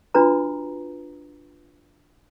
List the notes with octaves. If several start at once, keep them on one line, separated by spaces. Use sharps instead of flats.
D4 F4 F#4 B4 A#5